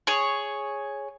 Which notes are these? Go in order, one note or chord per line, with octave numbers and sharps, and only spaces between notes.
G#4 C#5